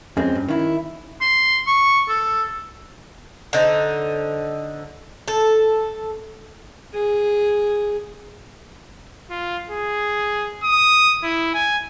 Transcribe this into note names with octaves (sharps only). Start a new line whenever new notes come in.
F2 G#3 C4 C#4
G2
D#3 E4
C6
C#6
A4
D3 D#4 C5
A4
G#4
F4
G#4
D#6
E4
G#5